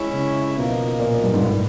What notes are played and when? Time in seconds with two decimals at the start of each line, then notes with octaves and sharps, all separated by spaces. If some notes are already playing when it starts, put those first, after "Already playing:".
Already playing: G#3 C#4 E4
0.13 C#3
0.56 B2 F3 A#3 D#4
1.00 A#2
1.23 G2
1.33 G#2
1.43 A2